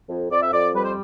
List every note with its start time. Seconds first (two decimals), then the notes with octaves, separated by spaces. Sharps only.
0.09 F2
0.31 F2 D5
0.42 E5
0.53 F2 D5
0.75 G3 B4
0.83 C5